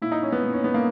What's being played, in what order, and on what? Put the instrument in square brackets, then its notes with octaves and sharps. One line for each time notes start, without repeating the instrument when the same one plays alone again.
[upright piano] A#2 E4
D#4
C#4
B3
A#2
C#4
B3
A#3